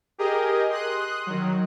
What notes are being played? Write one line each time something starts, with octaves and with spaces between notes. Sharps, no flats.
G4 G#4 A#4 D#5
C6 D#6 F#6
D#3 F#3